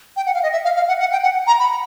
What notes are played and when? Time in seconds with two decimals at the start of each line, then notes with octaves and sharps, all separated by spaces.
0.16 G5
0.26 F#5
0.34 F5
0.43 D#5
0.53 E5
0.65 F5
0.76 F5
0.88 F#5
1.00 F#5
1.12 G5
1.23 F#5
1.47 A#5
1.59 B5